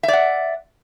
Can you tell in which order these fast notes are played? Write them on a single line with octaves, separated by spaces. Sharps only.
E5 D5 F#5